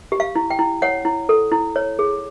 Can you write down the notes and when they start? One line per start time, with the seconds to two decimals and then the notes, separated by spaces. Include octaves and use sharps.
0.12 G4
0.20 F5
0.36 E4
0.50 G5
0.59 E4
0.82 C#5 F#5
1.05 E4
1.29 A4
1.52 E4
1.76 C#5
1.99 G#4